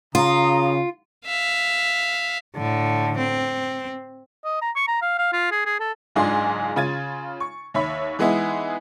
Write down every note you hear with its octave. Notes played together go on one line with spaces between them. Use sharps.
C#3 F4 A#5 D#6
E5 F5
A2 D3
C4
D#5
A#5
C#6
A#5
F5
F5
F4
G#4
G#4
A4
F#1 G#2 D4 F4 G#4 C6
C#3 F4 G#6 A6 D#7
C#6
D#2 C#5 E5 B5
E3 G#3 B3 D#4 E4